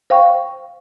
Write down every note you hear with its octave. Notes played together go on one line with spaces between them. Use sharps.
C5 F5 G5 C#6